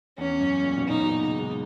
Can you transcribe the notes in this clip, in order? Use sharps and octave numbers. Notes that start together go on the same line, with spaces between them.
E2 C#4
F#2
A#2
B2
A#2 D#4
B2
C#3 D#4
G#3